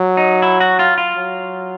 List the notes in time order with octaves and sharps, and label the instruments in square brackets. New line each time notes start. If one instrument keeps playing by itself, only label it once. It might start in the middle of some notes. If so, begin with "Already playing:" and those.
Already playing: [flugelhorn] F#3
[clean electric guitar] D#4
E4
F#4
F4
F4
[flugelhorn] F#3